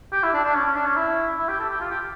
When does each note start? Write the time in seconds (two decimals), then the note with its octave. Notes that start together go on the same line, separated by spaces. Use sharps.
0.12 G4
0.23 E4
0.33 D4
0.44 D4
0.54 C#4
0.65 C#4
0.76 D4
0.86 C#4
0.96 E4
1.39 E4
1.49 G4
1.60 A4
1.70 G4
1.81 F4
1.90 G4